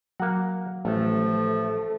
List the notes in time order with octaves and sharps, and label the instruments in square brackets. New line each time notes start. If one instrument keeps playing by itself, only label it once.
[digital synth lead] F#3 [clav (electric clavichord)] A#3 F#5
[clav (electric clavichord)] A1 [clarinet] F3 [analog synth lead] A3